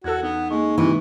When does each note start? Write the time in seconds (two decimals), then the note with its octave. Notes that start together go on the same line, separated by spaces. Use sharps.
0.04 E2 F#4 A4 F#6 G#6
0.23 B3 C#4 D#4
0.51 G#3 A#3 D#4 C#6
0.78 C3 D#3 E3 G#3